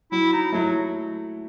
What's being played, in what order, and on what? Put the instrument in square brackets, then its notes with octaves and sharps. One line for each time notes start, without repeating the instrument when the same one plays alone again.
[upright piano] F#3 [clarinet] E4
[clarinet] D#4
[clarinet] F#3 [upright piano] A3 E4